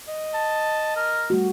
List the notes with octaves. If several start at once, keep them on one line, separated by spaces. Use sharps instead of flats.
D#5
A5
A#4
G3 A3 F#4